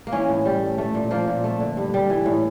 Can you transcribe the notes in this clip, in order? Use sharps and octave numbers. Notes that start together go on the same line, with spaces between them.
A#3
E3 C#4
A2
G3
A3
A3
A#2
F3 A#3
A#2
A3
D3
G2
G3
E3
A2